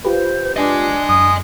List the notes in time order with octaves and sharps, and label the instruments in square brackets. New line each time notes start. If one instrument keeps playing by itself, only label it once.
[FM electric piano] F4 G4 B4 [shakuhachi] C5
[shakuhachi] D4 [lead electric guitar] D#5 G#5
[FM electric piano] F#2 [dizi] D#6